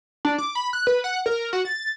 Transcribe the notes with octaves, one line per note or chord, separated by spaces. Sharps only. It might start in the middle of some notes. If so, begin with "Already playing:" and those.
D4
D6
B5
F#6
B4
F#5
A#4
F#4
A6